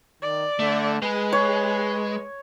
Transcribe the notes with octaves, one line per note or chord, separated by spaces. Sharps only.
D#3 D5
D3 A3
G#3 G#4 B4
C#5